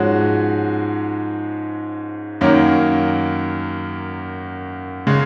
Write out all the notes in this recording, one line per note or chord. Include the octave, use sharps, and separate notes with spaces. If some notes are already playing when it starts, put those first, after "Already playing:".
Already playing: G#2 F3 G#3 C#4 F#4
F#2 D#3 A#3 C#4
C#3 G#3